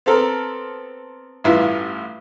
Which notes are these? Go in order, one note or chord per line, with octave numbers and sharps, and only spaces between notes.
B3 C4 A4 A#4
A1 G2 E4 F4